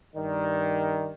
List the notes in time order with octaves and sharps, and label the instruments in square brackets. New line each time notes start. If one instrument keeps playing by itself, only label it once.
[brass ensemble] G2 D#3 D5